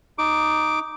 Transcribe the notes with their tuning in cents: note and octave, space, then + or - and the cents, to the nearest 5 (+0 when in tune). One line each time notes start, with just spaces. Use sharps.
D#4 +0 D6 +0